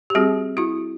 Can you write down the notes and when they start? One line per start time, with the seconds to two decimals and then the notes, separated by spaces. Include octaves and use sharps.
0.10 G4
0.15 G3 C4 F#4 G#4
0.57 E4 F#4